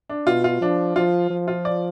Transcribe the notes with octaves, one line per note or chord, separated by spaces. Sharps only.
D4
B2 F4
F4
F3 D4
F3 F4
F3
F4
D5